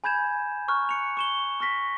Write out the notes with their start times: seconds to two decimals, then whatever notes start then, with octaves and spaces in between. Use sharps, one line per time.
0.04 G#5 B5 G6 G#6 E7
0.68 A#5 C#6 F6 F#6
0.89 C#7 F7
1.17 C#6 E7 G7
1.60 C#6 F6 A#6 B6